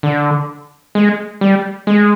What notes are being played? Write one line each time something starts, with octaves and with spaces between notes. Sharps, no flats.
D3
G#3
G3
G#3